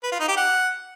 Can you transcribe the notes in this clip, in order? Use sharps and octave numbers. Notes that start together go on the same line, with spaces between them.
B4
F4
D#4
G4
F#5